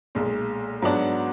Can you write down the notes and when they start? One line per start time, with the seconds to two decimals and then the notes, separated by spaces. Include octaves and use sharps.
0.15 B1 A#2 G#3
0.82 G#2 F#3 B3 D4 F#4